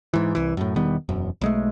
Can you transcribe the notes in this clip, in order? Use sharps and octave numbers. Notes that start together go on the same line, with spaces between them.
G#2 E3
C2 E3
F#2 A2
E1 D#3 G3 B3
E1 F#2
B1 G#3 A3